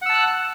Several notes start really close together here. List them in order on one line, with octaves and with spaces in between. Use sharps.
F#5 E6 A5 F#6